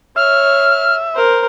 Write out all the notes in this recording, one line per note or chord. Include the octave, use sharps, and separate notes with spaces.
C#5 E5 F6
A#4 C5